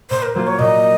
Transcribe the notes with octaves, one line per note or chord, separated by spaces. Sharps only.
A#2 C5
A#4
F#3 A#3 F4 C5
C#5
A#2 D#5